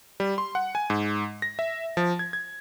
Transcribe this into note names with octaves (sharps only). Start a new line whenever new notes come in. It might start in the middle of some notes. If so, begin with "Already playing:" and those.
G3
C6
F#5
G#5
G#2
A#6
E5
F3
G#6
G#6